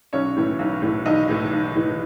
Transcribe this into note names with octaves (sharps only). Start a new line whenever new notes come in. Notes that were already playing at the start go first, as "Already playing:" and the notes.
B1 C#4 C#5
A2 E3
B1
A2 E3
B1 D#4 D#5
A2 E3
B1
A2 E3